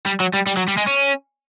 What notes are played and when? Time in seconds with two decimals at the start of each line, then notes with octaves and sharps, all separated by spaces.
0.06 G3
0.20 F#3
0.34 G3
0.47 G3
0.57 F#3
0.68 G3
0.77 G#3
0.87 C#4